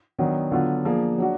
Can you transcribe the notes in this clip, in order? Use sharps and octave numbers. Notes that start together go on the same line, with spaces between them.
D#3 F#3 B3 D4
D3 F#3 B3 F4
F3 A#3 D4 G#4
F#3 D4 F#4